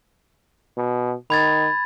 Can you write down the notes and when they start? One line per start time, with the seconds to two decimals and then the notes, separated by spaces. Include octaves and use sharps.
0.77 B2
1.30 D#3 B5 G#6 A6